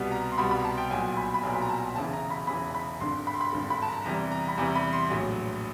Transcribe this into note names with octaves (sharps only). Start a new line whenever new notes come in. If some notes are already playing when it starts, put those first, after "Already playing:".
Already playing: C2 B2 G3 B3
A#5
C6
C2 B2 G3 B3 B5
B5
A#5
A5
G5
B1 A#2 F#3 B3 G#5
B5
B5
B1 A#2 F#3 B3 A#5
B5
A#5
A5
E1 E2 C#3 E3 A5
A#5
B5
E1 E2 C#3 E3 B5
B5
G#1 G2 D3 C6
B5
C6
B5
G#1 G2 D3
B5
A5
A#5
E2 C3 E3 G3 A#5
A#5
B5
E2 C3 E3 G3 A#5
B5
C6
A#1 A2 F#3